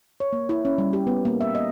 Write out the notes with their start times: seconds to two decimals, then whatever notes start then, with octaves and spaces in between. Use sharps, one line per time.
0.20 C#5
0.33 A#3
0.49 E4
0.65 C#4
0.78 G3
0.93 G4
1.07 B3
1.25 A#3
1.41 E5
1.55 D#5